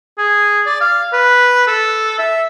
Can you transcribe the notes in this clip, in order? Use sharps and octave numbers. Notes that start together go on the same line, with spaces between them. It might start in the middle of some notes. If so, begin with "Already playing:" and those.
G#4
D5
F5
B4
A4
E5